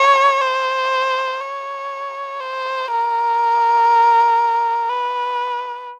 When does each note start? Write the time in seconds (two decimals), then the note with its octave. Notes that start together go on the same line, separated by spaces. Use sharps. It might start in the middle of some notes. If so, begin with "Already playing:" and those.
Already playing: C#5
0.42 C5
1.41 C#5
2.41 C5
2.91 A#4
4.89 B4